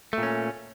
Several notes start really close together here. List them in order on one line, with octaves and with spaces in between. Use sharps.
A3 A#2 C#4